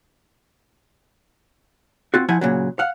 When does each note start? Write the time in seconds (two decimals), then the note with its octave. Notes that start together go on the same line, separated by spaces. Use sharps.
2.14 C4 F4 F#4
2.29 F3 E4 F#5 G#5
2.41 A#2 C#3 F#3
2.79 F5 F#5